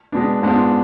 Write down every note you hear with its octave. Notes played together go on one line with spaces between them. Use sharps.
B2 G#3 B3 D4
G#2 G#3 B3 D4 F4